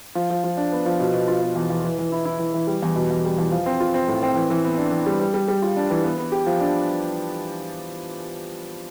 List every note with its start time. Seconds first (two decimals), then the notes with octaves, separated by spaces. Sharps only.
0.15 F3
0.30 F3
0.44 F3
0.57 D4
0.72 B3
0.86 F3
1.00 B2
1.13 B2
1.28 F4
1.42 B2
1.56 E2
1.70 E2
1.84 E3
1.98 E3
2.12 E4
2.25 E4
2.39 E3
2.54 E3
2.67 G3
2.82 E2
2.96 B2
3.10 E2
3.25 G3
3.38 E2
3.51 F3
3.66 C4
3.80 F4
3.94 C4
4.08 A2
4.23 C4
4.36 E3
4.50 E3
4.65 B3
4.78 D4
4.92 E3
5.06 G3
5.20 G3
5.34 G3
5.48 G3
5.62 F4
5.76 D4
5.90 E3
6.04 B3
6.18 B3
6.32 G4
6.46 F3
6.60 D4